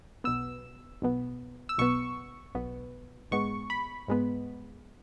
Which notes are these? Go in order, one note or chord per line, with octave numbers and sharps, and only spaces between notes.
B1 B2 B3 E6
B1 B2 B3
E6
B1 B2 B3 C#6
B1 B2 B3
G#2 G#3 B3 C#6
B5
G#2 G#3 B3